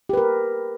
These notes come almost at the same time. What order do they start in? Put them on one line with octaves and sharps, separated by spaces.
G4 B4 A#4